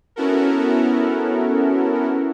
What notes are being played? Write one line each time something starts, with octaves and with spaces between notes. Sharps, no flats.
B3 C#4 E4 F#4 A4 A#4